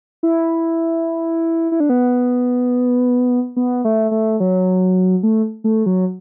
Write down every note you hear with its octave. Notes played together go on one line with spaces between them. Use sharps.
E4
E4
D4
B3
B3
A3
A3
F#3
A3
A3
F#3